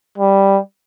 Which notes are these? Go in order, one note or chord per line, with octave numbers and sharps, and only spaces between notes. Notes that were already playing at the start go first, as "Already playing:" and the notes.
G3